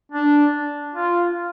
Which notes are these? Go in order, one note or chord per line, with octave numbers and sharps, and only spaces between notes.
D4
F4